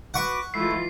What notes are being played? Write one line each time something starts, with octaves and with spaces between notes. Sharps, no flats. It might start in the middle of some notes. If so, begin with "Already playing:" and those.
F#4 B4 F#5 C#6 D6
E3 G#3 A3 E4 F4 A4 C7